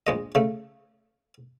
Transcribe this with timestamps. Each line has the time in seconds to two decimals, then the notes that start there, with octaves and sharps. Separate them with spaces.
0.07 A#1 G#3 D#5
0.35 C#3 A3